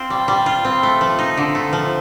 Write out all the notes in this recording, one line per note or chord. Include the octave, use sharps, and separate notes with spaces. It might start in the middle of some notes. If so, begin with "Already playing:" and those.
Already playing: C4 F4
G3
G3
F4
C4
A3
F3
D#4
D3
A3
F3